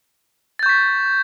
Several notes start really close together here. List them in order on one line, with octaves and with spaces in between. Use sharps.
A6 G6 C#6 B6